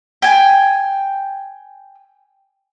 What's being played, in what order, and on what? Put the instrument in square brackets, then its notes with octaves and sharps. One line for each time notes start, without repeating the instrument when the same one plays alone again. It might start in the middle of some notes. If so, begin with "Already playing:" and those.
[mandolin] G5 G#5